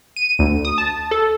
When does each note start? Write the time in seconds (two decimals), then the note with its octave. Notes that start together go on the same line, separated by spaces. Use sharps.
0.16 D#7
0.39 D2
0.65 D#6
0.78 A5
1.11 A4